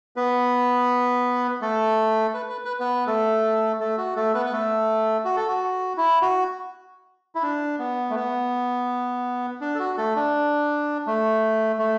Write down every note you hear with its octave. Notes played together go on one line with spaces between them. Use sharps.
B3 B4
A3 A4
B4
B4
B4
B3 B4
A3 A4
A3 A4
F#4
A3 A4
B3 B4
B4
A3 A4
F#4
A4
F#4
E4
F#4
E4
D4
B3
A3
B3
D4
A4
F#4
A3 A4
D4
A3
A3